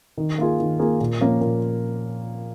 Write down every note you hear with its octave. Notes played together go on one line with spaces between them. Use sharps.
D#3
A#3 F4 G#4
D#3
A#3 F4 G#4
A#2
F3 A#3 C#4
A#2